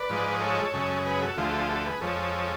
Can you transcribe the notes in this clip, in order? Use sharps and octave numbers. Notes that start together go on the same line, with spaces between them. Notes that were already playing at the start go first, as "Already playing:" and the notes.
Already playing: B4 D5
G#2 F3 G#3
A4 C#5
F#2 C#3 G#3
G#4 B4
F#4 A4
D2 D3 F3 A3 F4 G#4
F#4 A4
F4 G#4
F#4 A4
G#4 B4
F2 F3 G#3 A4 C#5